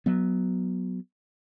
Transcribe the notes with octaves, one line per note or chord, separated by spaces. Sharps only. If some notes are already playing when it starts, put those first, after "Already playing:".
F#3 B3